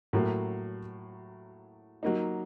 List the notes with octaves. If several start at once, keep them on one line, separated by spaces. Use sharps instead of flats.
A2 F#3 A#3
F#3 A#3 D#4